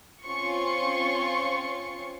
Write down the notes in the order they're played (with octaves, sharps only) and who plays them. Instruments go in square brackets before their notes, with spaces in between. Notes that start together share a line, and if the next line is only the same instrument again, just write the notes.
[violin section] C4 C#4 F4 C6 C#6